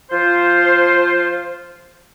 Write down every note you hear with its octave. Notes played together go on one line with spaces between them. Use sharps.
F3 F4 C5